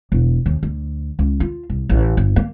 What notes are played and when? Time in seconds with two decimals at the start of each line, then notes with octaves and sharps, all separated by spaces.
0.12 E1
0.46 D#2
0.63 D2
1.19 C#2
1.40 F4
1.70 C2
1.89 A1
2.17 G1
2.36 A#3